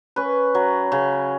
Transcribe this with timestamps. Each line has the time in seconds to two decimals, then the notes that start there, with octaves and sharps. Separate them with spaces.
0.16 C#4 B4
0.55 F#3
0.92 C#3